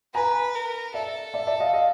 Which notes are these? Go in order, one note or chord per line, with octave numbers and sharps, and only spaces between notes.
B4 G#5 A#5
A#4
A4 D5 E5
D5 E5
D5 E5
D#5 F5
D#5 F5